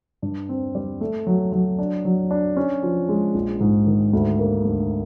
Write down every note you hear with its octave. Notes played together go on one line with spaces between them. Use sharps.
G2
C4
G3
A3
F#3
F#3
D4
F#3
D4
C#4
F3
G#3
A#1
G#2
D#3
D2
A#3
D2